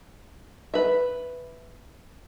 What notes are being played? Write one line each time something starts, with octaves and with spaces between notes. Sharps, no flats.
B4 E5